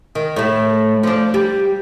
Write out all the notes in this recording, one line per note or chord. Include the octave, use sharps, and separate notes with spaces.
D#3
A2 A3
F3 D4
G3